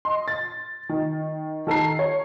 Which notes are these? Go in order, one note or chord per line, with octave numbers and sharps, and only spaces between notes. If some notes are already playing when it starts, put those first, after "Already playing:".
D#5 C6
A6
D#3
D#3 A4 A#5 C7
C#5